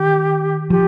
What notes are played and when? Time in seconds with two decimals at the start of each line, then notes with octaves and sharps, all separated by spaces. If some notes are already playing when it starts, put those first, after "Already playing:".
Already playing: D#3 G4
0.70 F3 G4